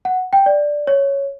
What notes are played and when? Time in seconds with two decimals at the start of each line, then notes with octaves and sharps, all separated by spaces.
0.05 F#5
0.33 G5
0.46 D5
0.87 C#5